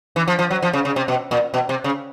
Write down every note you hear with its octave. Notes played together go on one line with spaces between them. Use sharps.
E3
F3
F3
F#3
F3
C#3
C#3
C3
B2
A#2
B2
C3
C#3